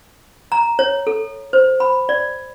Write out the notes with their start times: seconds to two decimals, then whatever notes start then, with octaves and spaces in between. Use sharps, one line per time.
0.52 A#5
0.79 C#5
1.07 A4
1.53 C5
1.80 B5
2.09 D5